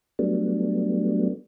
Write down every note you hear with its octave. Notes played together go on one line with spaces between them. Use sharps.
F#3 G3 A3 B3 D4